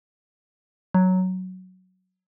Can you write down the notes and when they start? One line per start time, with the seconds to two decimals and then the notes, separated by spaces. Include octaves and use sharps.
0.94 F#3